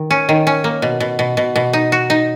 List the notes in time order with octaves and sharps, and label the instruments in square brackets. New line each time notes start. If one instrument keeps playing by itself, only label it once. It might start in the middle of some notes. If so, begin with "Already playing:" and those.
Already playing: [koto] D#3
C#4
D#3
C#4
A#3
B2
B2
B2
B2
B2
D#4
F#4
D#4